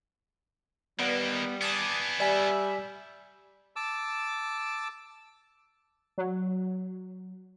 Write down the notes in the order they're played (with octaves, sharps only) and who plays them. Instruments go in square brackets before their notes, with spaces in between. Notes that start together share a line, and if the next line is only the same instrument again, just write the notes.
[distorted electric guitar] D#3 A#3 [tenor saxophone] G3 [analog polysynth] B3
[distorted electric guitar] B3 G#4 [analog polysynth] A5 D6 D#6
[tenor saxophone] G3 [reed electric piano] D5 G#5 [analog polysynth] E5
[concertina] A5 D6 E6
[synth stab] F#3